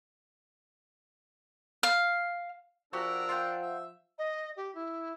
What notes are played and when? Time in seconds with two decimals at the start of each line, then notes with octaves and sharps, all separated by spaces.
1.83 F5
2.93 F3 D4 F#4 G4 A#4 E6
3.29 F4 F#5 G5
3.62 E5
4.18 D#5
4.57 G4
4.75 E4